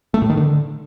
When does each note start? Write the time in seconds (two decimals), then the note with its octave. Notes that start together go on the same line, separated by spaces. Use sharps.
0.14 A3
0.22 A2
0.29 D#3
0.37 D3